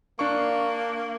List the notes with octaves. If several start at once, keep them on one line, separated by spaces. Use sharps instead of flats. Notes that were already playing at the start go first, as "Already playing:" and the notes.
A#3 D4 C#6